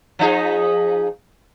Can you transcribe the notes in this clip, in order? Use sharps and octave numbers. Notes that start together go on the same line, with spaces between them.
F3 D#4 G#4